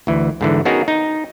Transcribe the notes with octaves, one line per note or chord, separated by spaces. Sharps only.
D2 E3
G#2 D3 E3
B3 C#4 D#4 F#4 G#4 A#4
D#4